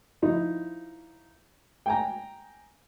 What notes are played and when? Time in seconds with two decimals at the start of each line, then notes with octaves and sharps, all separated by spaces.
0.22 F3 D#4 E4
1.86 G5 G#5 A#5